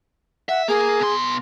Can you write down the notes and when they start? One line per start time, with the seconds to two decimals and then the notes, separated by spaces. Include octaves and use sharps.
0.49 E5 F#5
0.68 A#3 G#4 A#4
1.00 B2 C6